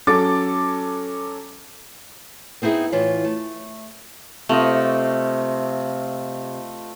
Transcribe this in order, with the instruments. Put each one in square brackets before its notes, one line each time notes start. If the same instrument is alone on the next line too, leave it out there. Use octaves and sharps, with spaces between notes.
[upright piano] F#3 C#4 A4 D6 A6
[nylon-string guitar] B3 C4 D#4 E4 G#4
A2 E3 F4 C#5
A3
[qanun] C3 [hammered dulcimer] A3 F4 D#5